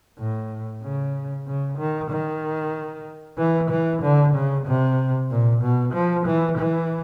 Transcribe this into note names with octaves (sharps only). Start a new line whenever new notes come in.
A2
C#3
C#3
D#3
D#3
E3
E3
D3
C#3
C3
A#2
B2
F3
E3
E3